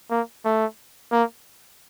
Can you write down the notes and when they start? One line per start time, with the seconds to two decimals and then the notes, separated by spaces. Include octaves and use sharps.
0.11 A#3
0.45 A3
1.12 A#3